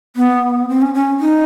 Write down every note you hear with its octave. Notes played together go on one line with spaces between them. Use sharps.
B3
C4
C#4
C#4
D#4